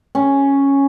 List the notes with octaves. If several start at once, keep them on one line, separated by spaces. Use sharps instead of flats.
C#4